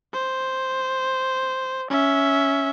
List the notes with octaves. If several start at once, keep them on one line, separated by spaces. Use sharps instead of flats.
C5
C#4 E5